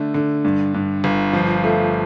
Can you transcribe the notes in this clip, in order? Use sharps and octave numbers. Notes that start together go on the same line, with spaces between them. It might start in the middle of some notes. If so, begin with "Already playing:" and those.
Already playing: D3 A3
D3
G2
G2
G1
F3
A3